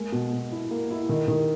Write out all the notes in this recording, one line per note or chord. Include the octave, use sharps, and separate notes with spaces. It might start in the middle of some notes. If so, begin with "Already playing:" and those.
Already playing: G#3 A#3
B2
B2
E4
A#3
E4
D#3
D#3